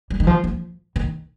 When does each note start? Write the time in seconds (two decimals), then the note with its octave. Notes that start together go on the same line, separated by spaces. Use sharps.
0.10 G3
0.20 D#3
0.27 F3
0.44 F3
0.96 D#3